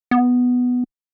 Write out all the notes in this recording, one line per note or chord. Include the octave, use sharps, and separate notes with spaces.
B3